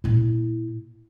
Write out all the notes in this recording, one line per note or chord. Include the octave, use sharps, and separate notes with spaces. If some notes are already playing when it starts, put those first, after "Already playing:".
A#2 E4